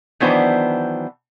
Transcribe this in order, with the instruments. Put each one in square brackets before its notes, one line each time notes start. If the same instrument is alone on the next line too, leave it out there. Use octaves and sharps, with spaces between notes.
[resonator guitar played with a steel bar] D#3 E3 F#3 B3 D4 C5